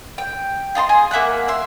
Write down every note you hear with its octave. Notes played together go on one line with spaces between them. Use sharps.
G5
F4 D#5 A5 C6
G#4
A#3 E5 F#5 F#6
E5 C6